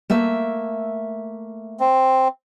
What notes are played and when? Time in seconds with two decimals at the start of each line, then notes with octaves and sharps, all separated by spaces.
0.10 A3 A#3 E5
1.80 C4